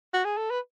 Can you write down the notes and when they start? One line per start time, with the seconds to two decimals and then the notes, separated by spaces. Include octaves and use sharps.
0.14 F#4
0.25 G#4
0.38 A4
0.50 B4